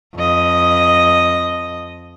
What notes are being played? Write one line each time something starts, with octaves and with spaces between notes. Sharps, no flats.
F2 D#5